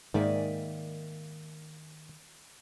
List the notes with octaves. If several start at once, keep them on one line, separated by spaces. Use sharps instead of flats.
G#2 D#3 A#3 D5 E5 G#5